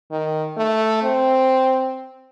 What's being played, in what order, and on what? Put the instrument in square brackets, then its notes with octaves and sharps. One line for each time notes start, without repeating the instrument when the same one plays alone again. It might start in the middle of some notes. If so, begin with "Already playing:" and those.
[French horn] D#3
A3
C4